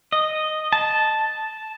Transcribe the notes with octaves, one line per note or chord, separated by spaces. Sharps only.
D#5
A5